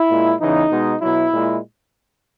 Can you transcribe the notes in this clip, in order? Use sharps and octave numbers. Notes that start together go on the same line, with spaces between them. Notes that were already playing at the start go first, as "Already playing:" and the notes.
Already playing: E4
A#2 G#3
E2 C#3 E3 D#4
B2 G#3
B2 F#3 E4
A#2 G#3